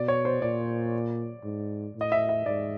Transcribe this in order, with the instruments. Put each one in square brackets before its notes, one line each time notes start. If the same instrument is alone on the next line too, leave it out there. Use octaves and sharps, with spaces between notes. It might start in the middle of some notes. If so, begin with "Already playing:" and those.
Already playing: [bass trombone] B2 [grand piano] D5
[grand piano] C#5
C5
[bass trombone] A#2 [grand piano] D5
[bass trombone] G#2
A2
[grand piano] D#5
E5
E5
[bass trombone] G#2 [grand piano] D5